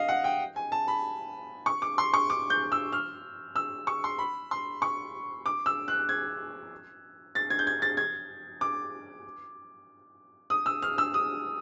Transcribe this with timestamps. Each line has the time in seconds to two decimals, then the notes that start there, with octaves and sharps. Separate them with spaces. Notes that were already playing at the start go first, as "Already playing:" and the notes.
Already playing: D#5 F5
0.08 F#5
0.24 G5
0.56 G#5
0.72 A5
0.88 B5
1.66 C#6
1.82 D6
1.98 C6
2.14 C#6
2.30 D6
2.50 G6
2.72 E6
2.92 F6
3.56 E6
3.87 C#6
4.04 C6
4.19 B5
4.51 C6
4.82 C#6
5.46 D6
5.66 E6
5.88 F#6
6.09 G#6
7.35 A6
7.50 G#6
7.59 G6
7.67 G#6
7.82 A6
7.97 G#6
8.61 D6
10.50 D#6
10.66 E6
10.82 F6
10.98 E6
11.14 D#6